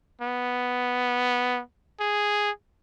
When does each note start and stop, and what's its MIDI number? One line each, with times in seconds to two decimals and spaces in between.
0.21 1.60 59
2.00 2.50 68